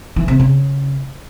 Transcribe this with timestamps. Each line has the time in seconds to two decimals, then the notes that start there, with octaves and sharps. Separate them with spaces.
0.16 E3
0.28 C3
0.40 C#3